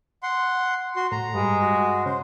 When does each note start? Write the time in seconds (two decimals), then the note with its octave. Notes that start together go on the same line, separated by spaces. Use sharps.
0.23 F#5 C6
0.96 F#4 C6
1.12 A2 A#5
1.34 G2 G#3
1.61 F#4
2.06 C#3 C5